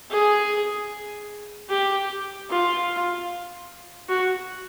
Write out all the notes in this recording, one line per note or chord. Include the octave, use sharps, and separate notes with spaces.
G#4
G4
F4
F#4